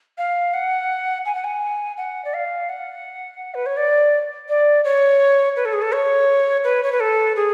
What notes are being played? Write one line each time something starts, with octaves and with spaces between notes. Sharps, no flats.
F5
F#5
G#5
F#5
G#5
F#5
D5
F5
F#5
B4
C#5
D5
D5
C#5
B4
A4
G#4
A4
C#5
B4
C#5
B4
A4
G#4